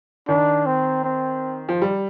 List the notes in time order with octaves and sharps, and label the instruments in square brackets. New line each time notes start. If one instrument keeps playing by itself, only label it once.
[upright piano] D#3 [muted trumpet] D4
[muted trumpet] C4
C4
[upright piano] F3
G3